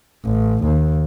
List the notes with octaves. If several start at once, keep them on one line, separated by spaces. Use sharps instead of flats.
A1
D#2